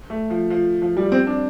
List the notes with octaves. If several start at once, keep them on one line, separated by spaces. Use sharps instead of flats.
A3
F3
F3
F3
G3
C4
D4